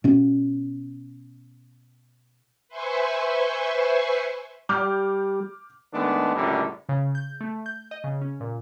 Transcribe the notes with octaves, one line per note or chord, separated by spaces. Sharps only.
B2 C#4
B4 C5 E5 G#5 C6 C#6
G3 D6 F6 G6
D#3 G#3 A3 B3 D4
C#2 F#2 A2 D3 G3
C#3
G6
A3
G6
D#5
C#3
C#4
A#2